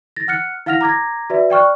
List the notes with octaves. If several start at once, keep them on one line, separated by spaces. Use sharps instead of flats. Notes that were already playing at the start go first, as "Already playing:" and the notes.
A6 A#6
F#5 F6 F#6 C#7
E4 F5 F#5 F6 A#6 F7
A#5 D6 G#6 A#6
F#4 B4 D5 E5
D5 G5 C#6 F6 F#6